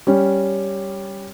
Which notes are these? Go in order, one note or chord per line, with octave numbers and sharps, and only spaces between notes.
G3 C#4